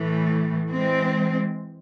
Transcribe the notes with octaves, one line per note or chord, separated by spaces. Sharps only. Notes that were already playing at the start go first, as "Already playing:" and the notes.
Already playing: A2 E3 A3
E3 G#3 C4